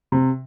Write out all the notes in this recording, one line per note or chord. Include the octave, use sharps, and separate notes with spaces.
C3